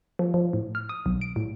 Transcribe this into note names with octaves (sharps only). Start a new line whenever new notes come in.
F3
F3
A2
F6
D#6
B1
D7
A2